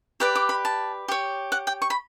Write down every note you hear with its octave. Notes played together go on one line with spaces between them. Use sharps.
G4 B4 D5 D6
D6
B5
A5
G4 C#5
F#5
G5
C#6
B5